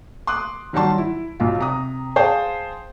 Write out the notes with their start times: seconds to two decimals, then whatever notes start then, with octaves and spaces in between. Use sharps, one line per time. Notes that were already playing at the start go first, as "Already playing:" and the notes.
0.27 C6 D6 D#6 F#6
0.73 D#3 F#3 G3 F#5 A5 C6
0.98 E4
1.40 B1 F4
1.59 C3 A#5 D#6
2.16 G#4 C5 F5 G5 A5 C6